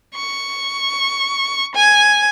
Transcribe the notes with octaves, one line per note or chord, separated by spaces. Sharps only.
C#6
G#5